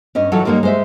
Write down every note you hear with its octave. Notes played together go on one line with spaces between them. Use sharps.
G2 C#4 D#5
E3 F#3 F4 F#4 A4 C#5
G3 G#3 A#3 D#4 C#5
G#3 C5 E5